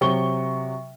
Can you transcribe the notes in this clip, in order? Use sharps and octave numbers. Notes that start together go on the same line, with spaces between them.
C3 F#3 C#6 G7